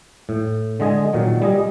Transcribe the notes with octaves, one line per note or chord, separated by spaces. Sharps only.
A2
D3 G#3 D#5 G#5
A#2 D#3 F#3
G3 G#4 D#5